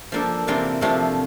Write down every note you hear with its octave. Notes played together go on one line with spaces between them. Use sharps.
F3 A#3 D4 A4
C3 E3 A#3 D4 F4
C3 F3 A3 D4 F4